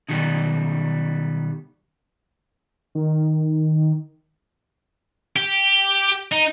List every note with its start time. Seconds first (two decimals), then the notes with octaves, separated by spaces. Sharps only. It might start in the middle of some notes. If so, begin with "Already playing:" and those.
0.09 B2 D#3 F#3 G3
2.95 D#3
5.36 G4
6.32 D#4